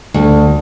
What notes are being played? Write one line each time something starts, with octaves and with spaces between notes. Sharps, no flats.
D2